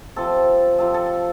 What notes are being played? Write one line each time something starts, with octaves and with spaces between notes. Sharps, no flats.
C3 F3 A4
C3 F3 A4
A4